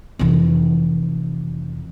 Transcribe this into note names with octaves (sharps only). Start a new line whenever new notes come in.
F1 E3